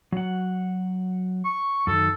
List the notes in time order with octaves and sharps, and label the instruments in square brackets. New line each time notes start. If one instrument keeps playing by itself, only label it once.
[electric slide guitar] F#3 F#5
[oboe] C#6
[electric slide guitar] F#2 D#3 [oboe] A4